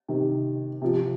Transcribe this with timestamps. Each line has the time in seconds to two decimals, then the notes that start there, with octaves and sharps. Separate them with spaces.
0.08 C3 D#3
0.82 C3 F3